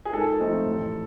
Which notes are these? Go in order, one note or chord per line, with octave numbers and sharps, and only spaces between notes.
G#4
G#2 A4
F3 A3 C4 D#4
A1